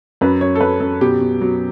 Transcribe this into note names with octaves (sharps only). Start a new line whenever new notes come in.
F#2 B4
F#2 C#5
A4
F#2 B4
F#2 A4
B2 G4
B2
F#3